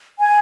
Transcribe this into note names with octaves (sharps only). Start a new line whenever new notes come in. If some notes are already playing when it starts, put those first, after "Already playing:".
G#5